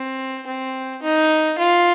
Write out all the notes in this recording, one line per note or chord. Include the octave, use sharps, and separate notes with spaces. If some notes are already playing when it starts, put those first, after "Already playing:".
Already playing: C4
C4
D#4
F4